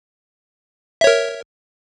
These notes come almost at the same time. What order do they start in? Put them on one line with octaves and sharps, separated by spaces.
E5 C#5 A#4